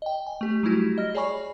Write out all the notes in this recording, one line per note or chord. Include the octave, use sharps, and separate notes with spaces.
D#5 G5
G#5
A3 G4
F#3 G3 A3 E4 F#4 G4
D#5 F6 A#6
G#4 C#5 D5 G#5 B5 C#6